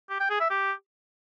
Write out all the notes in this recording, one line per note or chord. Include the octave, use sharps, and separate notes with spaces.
G4
G5
G#4
E5
G4